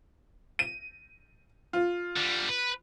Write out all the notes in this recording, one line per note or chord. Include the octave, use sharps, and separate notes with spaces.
D#7
F4
D3 G3
B4